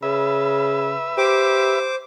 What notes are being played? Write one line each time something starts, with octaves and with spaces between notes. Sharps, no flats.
C#3 B4 E5
G4 C5 D6